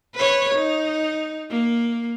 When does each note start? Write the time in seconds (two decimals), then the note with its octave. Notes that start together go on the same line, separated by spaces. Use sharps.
0.15 B4 C#5
0.55 D#4
1.50 A#3